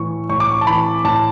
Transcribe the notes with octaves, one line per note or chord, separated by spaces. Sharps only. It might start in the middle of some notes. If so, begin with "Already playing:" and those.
Already playing: A2 E3 C#6
A2 C#6
D6
C#6
A5
E3 B5
A2 A5